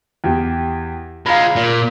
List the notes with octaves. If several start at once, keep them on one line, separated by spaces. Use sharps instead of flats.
E2 G4
G#3 F4 F5 A#5 B5
A#2